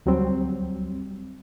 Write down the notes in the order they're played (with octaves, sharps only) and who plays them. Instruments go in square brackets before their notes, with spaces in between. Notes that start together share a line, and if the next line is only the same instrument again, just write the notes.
[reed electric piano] D2 F#3 G3 C4